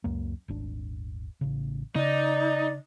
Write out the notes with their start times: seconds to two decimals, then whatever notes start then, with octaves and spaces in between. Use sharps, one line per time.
0.04 C#2 F#2 A#3
0.48 D#1 G#1 D4
1.41 A1 C#3
1.96 C#3 D#4 D5